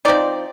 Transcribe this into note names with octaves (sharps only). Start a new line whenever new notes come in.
F3 C4 D#4 D5